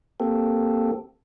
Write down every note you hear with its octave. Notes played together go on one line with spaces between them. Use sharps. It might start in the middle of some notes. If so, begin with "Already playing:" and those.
A#3 C4 G4 A4